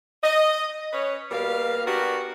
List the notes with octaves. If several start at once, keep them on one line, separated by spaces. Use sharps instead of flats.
D#5
C#4 B4 C#5
B2 G3 A#3 A#4 F5
B3 D4 F#4 G4 A#4